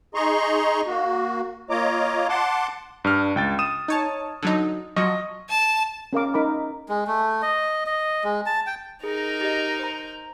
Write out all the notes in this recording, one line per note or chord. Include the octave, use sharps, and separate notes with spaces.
D#4 G#4 D#5 A#5 C6 C#6
A#3 F#4
A#3 F4 C#5 D#5 A#5 D6
F#5 A5 C6 D6
G2 D4 F6
C#2 G5 A6
D#6 D#7 E7
D#4 C#5 A5
D3 F#3 D#4
F3 F#3 D#5 C#6
A5
C#4 A#4 F5 D6
D#4 A#4 B5 D6
G#3
A3
D#5
D#5
G#3
A5
G5
D#4 G#4 A#4
G4 D#5
C5 A#5